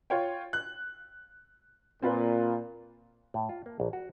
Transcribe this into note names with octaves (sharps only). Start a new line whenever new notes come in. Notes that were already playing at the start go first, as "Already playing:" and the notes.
F4 C#5 G5
F#6
A#2 C4 F4 B4
A2
F4
A#3
A#1
F#4